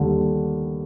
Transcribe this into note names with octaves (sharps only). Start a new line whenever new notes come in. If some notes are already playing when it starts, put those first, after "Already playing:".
Already playing: D#2 D3 G3